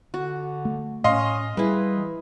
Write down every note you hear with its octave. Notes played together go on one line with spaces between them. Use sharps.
D3 F#4
A3
A2 C#4 D#5 F5 C6
G3 E4 G#4 B4
E3